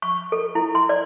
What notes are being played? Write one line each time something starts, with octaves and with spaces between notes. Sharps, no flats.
C#6
A4
E4
C6
D5